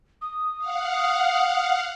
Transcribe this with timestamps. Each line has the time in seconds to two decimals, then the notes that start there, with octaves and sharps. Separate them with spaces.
0.22 D#6
0.58 F5 F#5